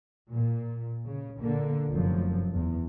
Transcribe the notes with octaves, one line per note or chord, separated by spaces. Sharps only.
A#2
C#3
A#2 D3 A#3
F1 F#2 F3
E2